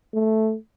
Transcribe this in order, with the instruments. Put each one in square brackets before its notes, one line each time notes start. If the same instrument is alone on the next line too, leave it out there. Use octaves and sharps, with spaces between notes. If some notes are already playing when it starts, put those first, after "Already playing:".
[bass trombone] A3